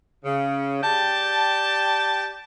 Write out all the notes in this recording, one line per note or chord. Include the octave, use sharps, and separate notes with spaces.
C#3
G4 D5 G5 A5